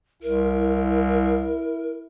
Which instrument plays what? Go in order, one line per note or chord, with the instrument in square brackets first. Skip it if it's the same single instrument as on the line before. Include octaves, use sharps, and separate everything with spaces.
[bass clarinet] C2 [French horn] E4 [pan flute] A#4